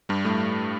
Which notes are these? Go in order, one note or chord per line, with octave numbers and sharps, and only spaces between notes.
G2 G3
A2 A3